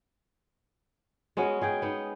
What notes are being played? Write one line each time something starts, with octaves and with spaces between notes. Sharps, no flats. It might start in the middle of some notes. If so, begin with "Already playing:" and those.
G#3 B3 C#4 F#4
G#3 G#4 G5
B3 D#4